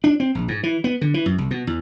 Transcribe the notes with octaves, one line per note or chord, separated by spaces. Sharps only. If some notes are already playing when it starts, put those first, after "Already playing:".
D4
C4
A#1
G#2
E3
B3
D3
E3
F#2
C2
B2
E2